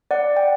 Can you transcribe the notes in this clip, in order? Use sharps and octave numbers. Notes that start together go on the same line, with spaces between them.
D5 F#5
G5